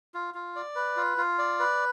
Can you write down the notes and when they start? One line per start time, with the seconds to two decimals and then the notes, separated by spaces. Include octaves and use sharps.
0.14 F4
0.34 F4
0.56 D5
0.75 B4
0.97 F4
1.18 F4
1.38 D5
1.60 B4